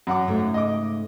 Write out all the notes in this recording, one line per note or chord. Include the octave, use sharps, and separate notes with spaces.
F#2 F#5 D6
G#2 C#3 A3
D#5 D6